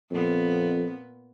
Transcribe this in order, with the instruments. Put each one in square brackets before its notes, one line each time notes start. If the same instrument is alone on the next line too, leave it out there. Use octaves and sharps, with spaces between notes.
[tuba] F2 [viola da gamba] A#2 B3